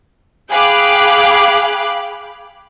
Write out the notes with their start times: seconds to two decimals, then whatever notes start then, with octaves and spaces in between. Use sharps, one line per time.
0.51 G#4 F5 G5 B5 D6 F#6